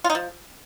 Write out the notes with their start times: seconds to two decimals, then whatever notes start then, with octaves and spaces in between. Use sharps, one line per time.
0.04 F4
0.10 D#4
0.15 F3